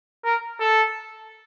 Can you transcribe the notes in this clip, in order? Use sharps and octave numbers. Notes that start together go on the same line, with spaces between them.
A#4
A4